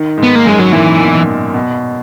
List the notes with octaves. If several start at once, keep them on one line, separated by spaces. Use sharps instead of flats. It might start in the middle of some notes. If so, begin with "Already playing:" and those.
Already playing: D#3
G#2
B3
A#3
F#2 G#3
F#3
A#2 E3
B2
B2